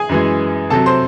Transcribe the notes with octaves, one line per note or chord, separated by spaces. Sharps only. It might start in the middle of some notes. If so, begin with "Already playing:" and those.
Already playing: G#4 G#5
F#2 E3 G#3
C3 F#3 A4 A5
C5 C6